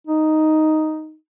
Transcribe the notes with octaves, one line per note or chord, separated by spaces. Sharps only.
D#4